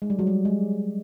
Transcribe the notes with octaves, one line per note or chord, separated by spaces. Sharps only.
G#3
G3
F#3
G3
G#3